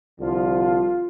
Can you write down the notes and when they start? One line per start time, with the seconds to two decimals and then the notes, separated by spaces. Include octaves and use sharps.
0.19 C2 D3 F3 F4